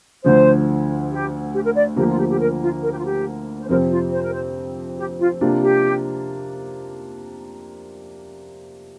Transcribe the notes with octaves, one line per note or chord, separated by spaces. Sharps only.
D2 D3 F3 C5
G4
G4
A#4
D5
D2 D3 F3 A#3 G4
F4
G4
G4
A#4
F4
A#4
G4
F4
G4
C5
F2 C3 F3 C4 A#4
F4
C5
A#4
C5
G4
F4
C3 A#3 D4 F4
G4